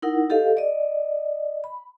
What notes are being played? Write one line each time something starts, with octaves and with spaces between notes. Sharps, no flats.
D#4 E4 A#4 F#5
G4 A4 D#5 F5
D5 D#5
B5